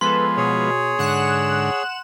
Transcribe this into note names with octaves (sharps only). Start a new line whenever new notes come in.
F3 G#3 B3 A4 B4 C6
B2 G#4 C#5
G#2 D3 F#5 F#6 E7